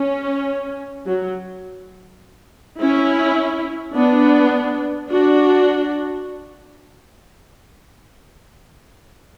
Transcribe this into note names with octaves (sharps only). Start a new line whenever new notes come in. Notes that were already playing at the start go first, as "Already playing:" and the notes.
Already playing: C#4
F#3
C#4 E4
B3 D4
D4 F#4